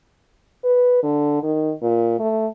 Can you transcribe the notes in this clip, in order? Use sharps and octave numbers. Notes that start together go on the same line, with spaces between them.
B4
D3
D#3
A#2
A3